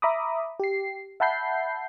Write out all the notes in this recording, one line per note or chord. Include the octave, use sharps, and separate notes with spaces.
E5 A#5 B5 D6 D#6
G4 C7
E5 F#5 A5 B5 G6 C7